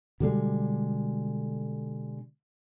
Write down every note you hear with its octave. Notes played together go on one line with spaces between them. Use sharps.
B2 D3 G3 G#3